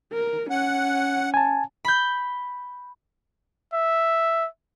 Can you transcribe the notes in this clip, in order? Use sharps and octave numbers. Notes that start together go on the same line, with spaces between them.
A#4
C#4 F#5
G#5 A5
B5 G6
E5